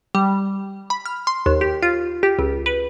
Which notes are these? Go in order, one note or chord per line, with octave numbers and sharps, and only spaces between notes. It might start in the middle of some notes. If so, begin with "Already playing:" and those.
G3
B5
F6
C6
D#2
G4
F4
G4
C#2
B4